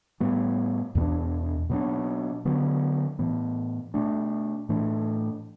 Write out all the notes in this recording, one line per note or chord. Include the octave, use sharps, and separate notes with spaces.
A2 G3 B3
E2 B2 A3 D4
B2 F#3 B3 D4
D3 F#3 B3
A2 E3 B3
B2 A3 D4
A2 E3 A3 D4